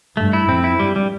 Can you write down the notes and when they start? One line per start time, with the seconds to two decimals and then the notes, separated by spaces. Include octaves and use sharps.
0.17 G2 A3
0.33 E4
0.48 F2 C4
0.64 E4
0.80 G2 G3
0.96 G3